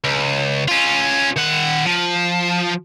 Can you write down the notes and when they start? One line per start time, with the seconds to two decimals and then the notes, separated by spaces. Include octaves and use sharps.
0.04 C#2
0.68 C#4 F4
1.36 D#3 F#5
1.86 F3